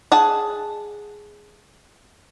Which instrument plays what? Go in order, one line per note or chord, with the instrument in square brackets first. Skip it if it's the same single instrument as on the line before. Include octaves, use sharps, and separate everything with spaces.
[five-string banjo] G#4 F#5 A5